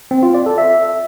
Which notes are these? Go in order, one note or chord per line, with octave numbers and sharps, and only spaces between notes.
C4
F4
D5
A4
E5